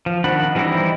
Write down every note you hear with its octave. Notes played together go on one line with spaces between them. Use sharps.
F3
D#3 D4 F#5 B5
E3 G3 C4 D#4 E4